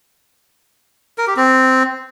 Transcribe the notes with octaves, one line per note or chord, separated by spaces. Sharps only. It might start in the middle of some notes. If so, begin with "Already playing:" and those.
A#4
G4
C4